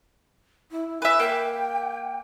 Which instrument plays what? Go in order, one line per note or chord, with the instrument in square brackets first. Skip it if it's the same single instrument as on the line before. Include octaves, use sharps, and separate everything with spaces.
[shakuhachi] E4
[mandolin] B4 E5 [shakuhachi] G#5
[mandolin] A#3 [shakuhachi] G5